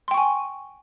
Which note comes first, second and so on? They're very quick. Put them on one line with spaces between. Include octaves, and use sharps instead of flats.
C6 G5 C#6 G#5